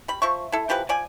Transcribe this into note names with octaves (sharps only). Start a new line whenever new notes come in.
G3 B5
F3 E5 C#6
E4 A4
E3 F3 G4 B4
F3 D5 G#5